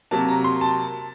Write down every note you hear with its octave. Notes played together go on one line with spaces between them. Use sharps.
C3 F#3 A#3 A5
A#5
C6
A5